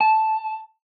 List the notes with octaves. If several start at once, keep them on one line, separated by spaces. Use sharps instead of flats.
A5